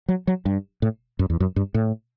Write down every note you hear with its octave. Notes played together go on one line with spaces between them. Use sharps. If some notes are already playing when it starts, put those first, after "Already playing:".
F#3
F#3
G2
A2
F#2
E2
F#2
G2
A2